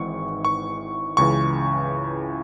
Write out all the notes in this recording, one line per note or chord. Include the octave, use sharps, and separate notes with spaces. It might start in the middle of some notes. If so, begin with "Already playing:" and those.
Already playing: G#1 G#2 E3 C#6
C#6
C#2 C#3 E3 C#6